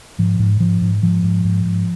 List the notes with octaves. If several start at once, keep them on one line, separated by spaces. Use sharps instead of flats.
G#2 F3
G#2
G#2 F3
G#2
G#2 F3
G#2
G#2
G#2